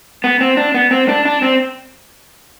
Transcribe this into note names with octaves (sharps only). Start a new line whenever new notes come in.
B3
C4
D4
B3
C4
D4
D4
C4